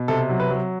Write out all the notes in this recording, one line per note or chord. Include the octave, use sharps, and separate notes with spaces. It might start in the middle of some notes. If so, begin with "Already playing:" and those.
Already playing: B2
C3 A4
F#3
B4
F#3